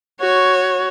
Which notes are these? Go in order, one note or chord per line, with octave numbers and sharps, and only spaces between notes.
F#4 C#5